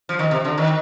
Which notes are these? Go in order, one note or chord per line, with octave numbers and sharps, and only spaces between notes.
F3
D#3
C3
D3
D#3